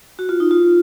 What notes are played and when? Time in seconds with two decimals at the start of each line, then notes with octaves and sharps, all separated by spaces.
0.19 F#4
0.29 F4
0.40 D#4
0.51 F4